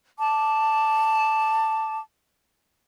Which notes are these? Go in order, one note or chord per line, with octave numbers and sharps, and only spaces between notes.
A5 D6